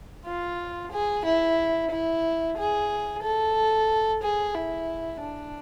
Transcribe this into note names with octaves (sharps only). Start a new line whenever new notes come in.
F4
G#4
E4
E4
G#4
A4
G#4
E4
D4